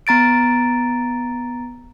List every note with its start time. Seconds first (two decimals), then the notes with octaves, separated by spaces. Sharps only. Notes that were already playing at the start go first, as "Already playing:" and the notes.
0.07 B3 A#5 A6 D7